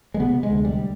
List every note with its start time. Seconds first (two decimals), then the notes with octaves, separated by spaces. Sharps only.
0.14 G#3
0.20 C3 B3
0.43 G#3
0.50 D2
0.65 G3